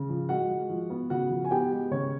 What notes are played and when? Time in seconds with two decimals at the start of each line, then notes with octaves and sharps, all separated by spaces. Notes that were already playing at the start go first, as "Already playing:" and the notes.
Already playing: C#3
0.09 F3
0.29 G#3 F#4 F#5
0.49 G#3
0.70 F3
0.90 B3
1.10 C#3 F#4 F#5
1.31 F3
1.45 G#5
1.51 B3 G4 G5
1.71 G#3
1.91 C#3 C#4 C#5